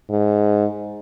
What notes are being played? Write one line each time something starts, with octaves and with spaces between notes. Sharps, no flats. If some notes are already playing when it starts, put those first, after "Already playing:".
G#2